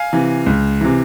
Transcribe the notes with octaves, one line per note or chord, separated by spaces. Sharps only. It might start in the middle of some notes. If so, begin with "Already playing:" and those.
Already playing: F5 G#5
C3 E3
C#2
C3 E3